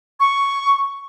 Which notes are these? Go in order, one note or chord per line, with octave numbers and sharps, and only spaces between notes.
C#6